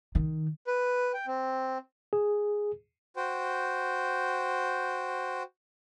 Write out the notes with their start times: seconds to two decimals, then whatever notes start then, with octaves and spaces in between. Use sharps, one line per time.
0.15 D#3
0.67 B4
1.14 G5
1.27 C4
2.13 G#4
3.17 F#4 C5 G5